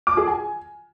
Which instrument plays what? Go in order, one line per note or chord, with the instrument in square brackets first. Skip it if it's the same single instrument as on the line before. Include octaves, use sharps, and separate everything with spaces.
[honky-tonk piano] D6
G#4
G#5